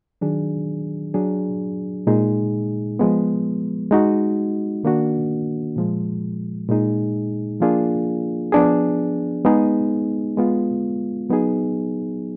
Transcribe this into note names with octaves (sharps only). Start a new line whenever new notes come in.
D#3 F#3 D4 G#4
F#3 D4 G#4
A#2 G#3 D#4 G#4
F3 G#3 B3
G#3 D#4 F#4
D#3 A#3 D4 F#4
A#2 F3 G#3
A#2 G#3 D#4 G#4
F3 A#3 D4 F4 G#4
F3 B3 D4 G#4
G#3 B3 D#4 G#4
G#3 B3 F4
F#3 B3 D#4 G#4